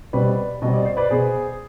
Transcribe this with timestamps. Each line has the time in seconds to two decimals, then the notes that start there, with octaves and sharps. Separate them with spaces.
0.13 B2 G3 C4 B4 D5
0.62 B2 G3 C4 D#5
0.74 D5
0.85 C5
0.97 B4 D5
1.10 B2 B3 G#4 C5